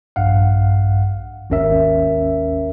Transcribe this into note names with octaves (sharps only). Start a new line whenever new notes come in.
A#1 G2 F5 F#5
G#1 D#2 C#4 A#4 E5